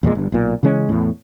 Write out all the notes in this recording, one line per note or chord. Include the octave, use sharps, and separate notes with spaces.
E2 A#2 F3 G#3
G1 G2
B1 A#2
C#3 E3 G#3 C#4
E2 A2